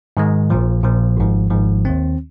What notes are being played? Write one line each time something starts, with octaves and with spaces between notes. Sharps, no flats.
G#2 D#3 G#3
A#1 A#2 F3
A#1 A#2 F3
G#1 G#2 F3
G#1 G#2 F3
D#2 D#3 C4